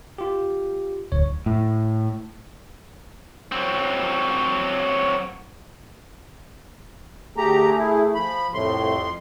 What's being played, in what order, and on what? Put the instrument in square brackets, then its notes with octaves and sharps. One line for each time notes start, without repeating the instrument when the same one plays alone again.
[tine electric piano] F4 G4
[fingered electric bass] D1 [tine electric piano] C#5
[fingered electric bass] A2
[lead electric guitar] F#3 C4
[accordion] D2 G4 A#5 [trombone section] A3 G#4
[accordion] E4
F3 B5
[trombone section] C2 A2 [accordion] F2 C6